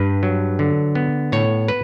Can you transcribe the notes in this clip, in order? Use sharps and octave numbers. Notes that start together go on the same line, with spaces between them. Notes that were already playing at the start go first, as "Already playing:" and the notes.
Already playing: G2 B4
F#3
D3
B3
A2 C#5
B4